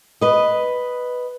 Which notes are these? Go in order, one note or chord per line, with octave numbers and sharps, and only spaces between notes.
B4 D#5